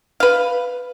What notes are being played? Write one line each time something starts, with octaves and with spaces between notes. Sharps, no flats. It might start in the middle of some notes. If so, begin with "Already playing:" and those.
B4 F5